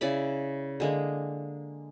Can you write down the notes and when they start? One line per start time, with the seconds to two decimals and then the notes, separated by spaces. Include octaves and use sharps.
0.01 C#3 E4 D5 B5
0.80 D3 G#3 A#3